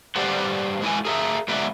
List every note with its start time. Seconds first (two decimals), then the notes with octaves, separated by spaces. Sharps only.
0.16 G3 G4 B4 C5 D5 F#5
0.82 G#3 E4 B4 G#5
1.05 G#4 A#4 C#5 E5
1.48 F#3 G#3 B3 B4 D5 E5